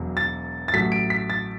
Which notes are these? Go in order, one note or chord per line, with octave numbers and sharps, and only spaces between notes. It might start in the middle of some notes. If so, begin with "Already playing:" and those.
Already playing: E1 E2 B2 F#3
A6
A6
A1 A2 F#3 B6
D7
B6
A6